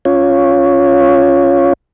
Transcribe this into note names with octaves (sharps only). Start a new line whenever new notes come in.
C#4 F4 C#5